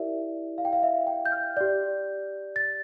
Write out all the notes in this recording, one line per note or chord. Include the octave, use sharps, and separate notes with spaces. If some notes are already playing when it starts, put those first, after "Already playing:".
Already playing: E4 G4 A#4 D5 E5
F5
G5
F5
E5
G5
G6
F6
G4 D5 G6
A6